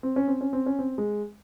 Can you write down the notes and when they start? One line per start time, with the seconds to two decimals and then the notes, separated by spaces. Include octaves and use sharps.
0.03 C4
0.16 C#4
0.28 C4
0.41 C#4
0.53 C4
0.66 C#4
0.79 C4
0.98 G#3